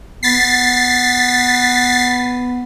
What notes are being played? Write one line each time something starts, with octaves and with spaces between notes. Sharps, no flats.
B3 A6 B6 C7